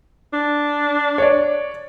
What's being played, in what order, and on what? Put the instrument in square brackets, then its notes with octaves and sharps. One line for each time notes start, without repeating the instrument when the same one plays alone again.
[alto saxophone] D4
[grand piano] C#5 D5